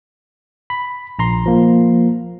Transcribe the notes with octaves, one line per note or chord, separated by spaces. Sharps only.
B5
A#1 A#5 C6
F3 A#3